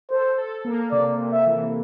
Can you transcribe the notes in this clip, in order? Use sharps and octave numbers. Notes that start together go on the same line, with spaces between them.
A4 C5
A4
A#3
C3 D5
C3
E5
E3